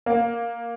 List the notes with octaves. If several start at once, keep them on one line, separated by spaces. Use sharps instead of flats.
A#3